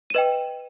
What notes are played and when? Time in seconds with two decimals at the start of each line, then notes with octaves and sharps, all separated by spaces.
0.10 D#7
0.14 B4 D#5 G5 E7